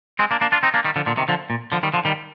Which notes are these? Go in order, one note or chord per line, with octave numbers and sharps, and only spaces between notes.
G#3 C4
A#3 D4
A#3 D4
D4 F4
C4 D#4
A#3 D4
D#3 G3
D3 F3
A#2 D3
C3 D#3
D3 F3
A#2
D3 F3
D#3 G3
D3 F3
D#3 G3